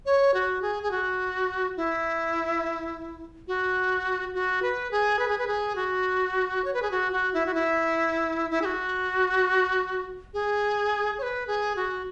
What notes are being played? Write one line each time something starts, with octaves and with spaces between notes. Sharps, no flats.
C#5
F#4
G#4
G#4
F#4
E4
F#4
F#4
B4
G#4
B4
G#4
B4
G#4
F#4
C#5
B4
G#4
F#4
F#4
E4
F#4
E4
E4
G#4
F#4
G#4
C#5
B4
G#4
F#4